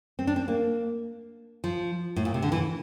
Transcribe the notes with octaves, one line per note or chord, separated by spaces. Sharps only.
C4
D4
C4
A#3
F3
A2
A#2
C3
D3
E3